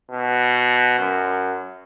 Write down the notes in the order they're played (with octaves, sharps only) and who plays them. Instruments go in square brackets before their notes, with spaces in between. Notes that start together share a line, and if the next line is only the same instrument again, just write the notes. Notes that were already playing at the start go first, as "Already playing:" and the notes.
[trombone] B2
F#2